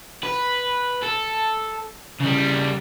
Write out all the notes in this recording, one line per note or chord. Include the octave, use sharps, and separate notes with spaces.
B4
A4
C#3 G3